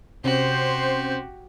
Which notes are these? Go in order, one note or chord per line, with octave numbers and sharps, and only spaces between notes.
C3 C4 C#4 F#4 G4 C5